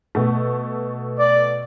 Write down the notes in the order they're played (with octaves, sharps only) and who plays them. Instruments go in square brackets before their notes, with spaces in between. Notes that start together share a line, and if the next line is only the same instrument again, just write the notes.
[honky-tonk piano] B2 A3
[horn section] D5